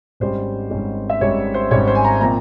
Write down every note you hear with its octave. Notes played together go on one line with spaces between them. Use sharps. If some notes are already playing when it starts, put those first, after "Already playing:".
G#1 G#2 G3 C#4 C5
G#1 G#2 G3 C#4
E5
G#1 G#2 G3 C#4 C#5
C5
G#1 G#2 G3 C#4 C#5
C5
G#5
A#5
A#2 F3 C4 A#5